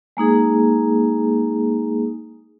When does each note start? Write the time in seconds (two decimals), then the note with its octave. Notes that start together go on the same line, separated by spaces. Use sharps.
0.17 G#3 A#3 D#4 G#4